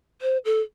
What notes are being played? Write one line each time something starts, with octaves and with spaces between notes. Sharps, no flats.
C5
A4